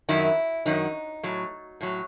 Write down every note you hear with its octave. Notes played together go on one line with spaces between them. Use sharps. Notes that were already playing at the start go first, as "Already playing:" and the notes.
F#2 D#3 F#3 E4
F#2 D#3 F#3 D#4
A2 F#3
A2 F#3